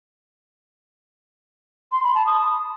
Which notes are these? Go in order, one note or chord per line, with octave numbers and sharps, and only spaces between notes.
C6
B5
A5
D#6